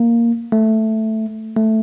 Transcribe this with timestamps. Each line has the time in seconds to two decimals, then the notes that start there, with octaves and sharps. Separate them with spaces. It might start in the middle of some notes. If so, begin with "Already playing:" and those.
Already playing: A#3
0.52 A3
1.57 A3